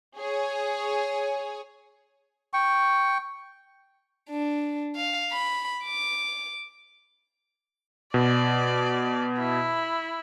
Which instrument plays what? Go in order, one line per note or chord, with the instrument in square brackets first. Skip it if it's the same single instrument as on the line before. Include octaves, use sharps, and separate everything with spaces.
[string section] G#4 C#5 G#5
[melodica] G5 C#6
[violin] D4
F5
B5
D6
[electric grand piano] B2 [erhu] D5
[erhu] E4